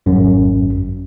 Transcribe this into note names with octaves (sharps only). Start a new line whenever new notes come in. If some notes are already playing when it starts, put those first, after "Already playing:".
G#1 F#2